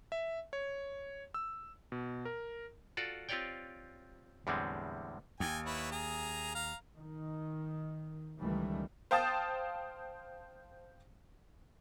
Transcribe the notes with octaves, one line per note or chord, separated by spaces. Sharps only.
E5
C#5
E6
B2
A#4
F4 F#4 A4 D5
C4 F4 G4 C#5 D5 G5
E2 A2 D3 G3 G#3 C4
D#2 G5 G#5
E4 B4 C#5
G#4 A#5
F5 A#5
D#3
C#2 D#3 E3 G3 A3
C5 F5 G5 A5 D#6 A6